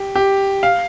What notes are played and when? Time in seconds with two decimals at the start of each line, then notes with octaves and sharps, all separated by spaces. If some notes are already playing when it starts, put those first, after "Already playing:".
Already playing: G4
0.15 G4
0.63 F5